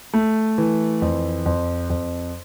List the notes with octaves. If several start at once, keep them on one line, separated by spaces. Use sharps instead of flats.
A3
E3
F2
F2
F2